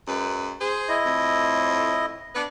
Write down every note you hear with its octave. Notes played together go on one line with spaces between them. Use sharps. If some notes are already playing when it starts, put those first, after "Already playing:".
F#2 G#3 B4
G#4 C5
E4 D#5
F2 A2
B3 D4 B4